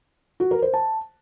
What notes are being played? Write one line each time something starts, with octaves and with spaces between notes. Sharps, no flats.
F#4
A#4
C5
A5